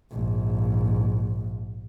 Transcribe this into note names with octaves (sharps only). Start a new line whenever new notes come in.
A#1 G#2